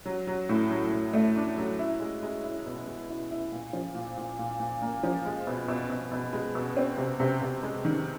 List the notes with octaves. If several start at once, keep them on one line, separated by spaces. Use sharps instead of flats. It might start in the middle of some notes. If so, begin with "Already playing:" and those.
F#3
F#3
A2
F#3
A2
A3
D4
F#3
E4
G#3
G#3
E4
B2
G#3
E4
E4
A#2
F3
A#2
A#2
A#2
A#2
A#3
F3
G#3
B2
B2
B2
B2
G#3
B2
C4
C3
C3
C3
G#3
D#3